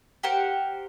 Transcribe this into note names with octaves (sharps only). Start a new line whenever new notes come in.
G4 A#4 C5 F#5